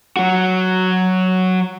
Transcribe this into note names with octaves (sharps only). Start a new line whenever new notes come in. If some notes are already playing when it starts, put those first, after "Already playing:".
F#3 F#4